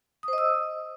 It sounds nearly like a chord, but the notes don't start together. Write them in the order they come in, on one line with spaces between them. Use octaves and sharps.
D#6 C5 D#5 E6